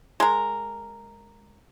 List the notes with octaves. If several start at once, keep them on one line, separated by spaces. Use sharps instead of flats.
G#3 A#4